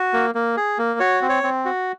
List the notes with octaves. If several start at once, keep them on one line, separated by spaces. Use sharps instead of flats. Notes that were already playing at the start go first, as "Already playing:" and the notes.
Already playing: F#4
A#3
A#3
G#4
A#3
F#4 C#5
C4
C#5
C4
F#4